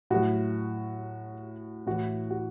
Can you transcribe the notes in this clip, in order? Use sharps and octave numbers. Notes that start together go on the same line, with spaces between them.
A2 F#3 F#4
A2 E3 F#4
F#4